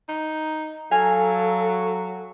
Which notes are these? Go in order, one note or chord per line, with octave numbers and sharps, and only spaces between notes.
D#4
F#3 A4 F5 G#5 A#5